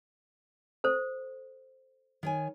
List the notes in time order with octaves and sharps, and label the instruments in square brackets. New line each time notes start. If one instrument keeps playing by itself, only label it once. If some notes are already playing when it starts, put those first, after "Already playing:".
[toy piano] A4 C5
[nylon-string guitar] D#3 C#5 G#5